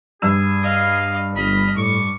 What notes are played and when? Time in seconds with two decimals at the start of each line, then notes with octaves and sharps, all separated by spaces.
0.22 G2 G#4 E6 E7
0.62 D#5 F5
1.35 G1 D#5 B5 F6
1.76 A2 C#6 D6